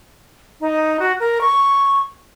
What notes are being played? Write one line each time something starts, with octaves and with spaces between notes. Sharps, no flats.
D#4
F#4
A#4
C#6